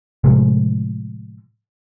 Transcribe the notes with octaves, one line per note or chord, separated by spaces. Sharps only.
A2 C3 F3 G#3